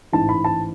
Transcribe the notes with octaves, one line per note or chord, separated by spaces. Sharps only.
A1 G#2 E3 A5
B5
A5